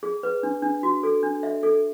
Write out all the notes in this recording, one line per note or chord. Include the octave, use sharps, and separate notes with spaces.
G#4
B4
D4
D4
F#4
A4
D4
E5
A4